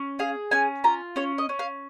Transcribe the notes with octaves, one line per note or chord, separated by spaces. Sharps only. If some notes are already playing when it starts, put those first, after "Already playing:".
Already playing: C#4
G#4 F5
C#4 G#5
F4 A#5
C#4 C#5
D#5
C#4
F5